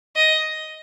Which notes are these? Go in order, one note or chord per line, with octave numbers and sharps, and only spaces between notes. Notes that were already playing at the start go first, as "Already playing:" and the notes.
D#5